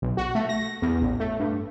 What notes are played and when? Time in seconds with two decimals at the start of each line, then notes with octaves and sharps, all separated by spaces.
0.02 B1
0.17 F#4
0.35 A3
0.49 A#6
0.82 E2
1.02 A1
1.20 A3
1.39 G2